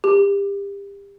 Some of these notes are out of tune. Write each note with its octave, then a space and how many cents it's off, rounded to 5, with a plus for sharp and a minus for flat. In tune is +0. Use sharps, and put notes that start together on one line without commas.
G4 +30